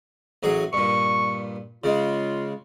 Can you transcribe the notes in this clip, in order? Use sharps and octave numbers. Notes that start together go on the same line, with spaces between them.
A1 F#3 G#4
G2 A#2 C#6
C#3 G#3 F4